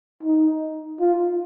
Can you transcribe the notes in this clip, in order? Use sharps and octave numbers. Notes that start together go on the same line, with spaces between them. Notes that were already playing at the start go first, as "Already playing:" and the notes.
D#4
F4